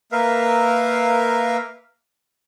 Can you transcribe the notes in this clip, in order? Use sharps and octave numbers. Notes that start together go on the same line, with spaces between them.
A#3 A#4 B4 E5 F5